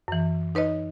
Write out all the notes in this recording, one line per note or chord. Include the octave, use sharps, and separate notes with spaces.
F#2 E3
D#4 B4 C#5 D#5